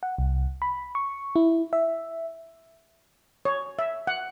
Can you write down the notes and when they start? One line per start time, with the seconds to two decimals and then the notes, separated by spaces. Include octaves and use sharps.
0.03 F#5
0.18 C2
0.62 B5
0.95 C#6
1.36 E4
1.73 E5
3.45 C#5
3.79 E5
4.07 F#5